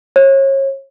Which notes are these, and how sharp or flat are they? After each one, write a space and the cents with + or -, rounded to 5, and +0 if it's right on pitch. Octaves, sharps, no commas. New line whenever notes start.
C#5 -35